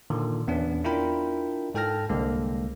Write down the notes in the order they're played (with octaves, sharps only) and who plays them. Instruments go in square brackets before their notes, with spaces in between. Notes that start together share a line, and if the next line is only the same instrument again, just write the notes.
[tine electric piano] A#2 D3 D#3
E2 B3 C#4 D4
D4 E4 F4 A#4 G5 B5
G#2 A4 G5 A5 F6 A#6
C2 D3 G#3 A#3